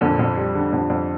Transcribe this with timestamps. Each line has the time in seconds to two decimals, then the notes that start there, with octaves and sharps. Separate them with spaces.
0.01 F2 A#2 D3
0.19 F2
0.37 G3
0.55 D3
0.73 F2
0.90 F2